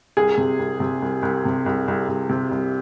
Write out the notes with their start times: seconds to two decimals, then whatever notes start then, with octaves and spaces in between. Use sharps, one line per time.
0.17 C2 G#4
0.37 C3
0.59 C2
0.80 C3
1.02 C2
1.22 C2
1.45 C3
1.66 C2
1.88 C2
2.08 C2
2.29 C3
2.51 C2